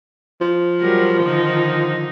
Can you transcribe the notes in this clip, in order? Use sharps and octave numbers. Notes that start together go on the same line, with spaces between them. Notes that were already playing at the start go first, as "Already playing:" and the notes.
F3
F#3 G3 A#4
D3 D#3 D#4